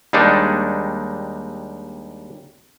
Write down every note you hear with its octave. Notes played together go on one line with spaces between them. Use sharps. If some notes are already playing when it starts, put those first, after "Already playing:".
D#2 G3 G#3 D4 D#4